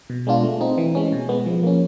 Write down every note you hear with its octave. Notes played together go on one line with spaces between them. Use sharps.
B2
G#3 B3 D4 F4
A3
C4 D#4
E3
G#3 C#4
B2
G#3 B3
F3
A#3 C#4